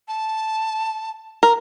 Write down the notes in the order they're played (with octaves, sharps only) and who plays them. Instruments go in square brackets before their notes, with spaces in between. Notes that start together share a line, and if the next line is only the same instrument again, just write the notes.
[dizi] A5
[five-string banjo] A#4